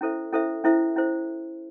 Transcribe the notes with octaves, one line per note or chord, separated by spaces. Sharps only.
C#4 E4 A4 C5 E5
C#4 E4 A4 C5 E5
C#4 E4 A4 C5 E5
C#4 E4 A4 C5 E5